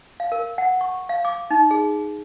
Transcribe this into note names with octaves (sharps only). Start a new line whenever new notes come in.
F5
A#4
F#5
C#6
F5
D6
D#4
G#4